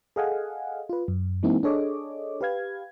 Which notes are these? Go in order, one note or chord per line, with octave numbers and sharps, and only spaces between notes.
G#4 A4 D#5 F5 F#5 G#5
F4 B4
F#2
E3 G#3 A#3 C4 D#4 E4
D4 G#4 A4 C#5 D#5 D6
G4 B4 F5 G#6